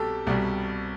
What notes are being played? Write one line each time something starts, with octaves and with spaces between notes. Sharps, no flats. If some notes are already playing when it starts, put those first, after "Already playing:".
Already playing: C2 B2 G3 G4 A4
C2 B2 G3